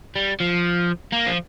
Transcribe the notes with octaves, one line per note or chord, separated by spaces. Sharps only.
G3
F3
A#3
F3